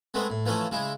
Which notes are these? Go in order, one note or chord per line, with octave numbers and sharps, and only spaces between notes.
G#3 A3 B3 C4
A2
E3 F3 A3 C#4 A4
C#3 G#3 E4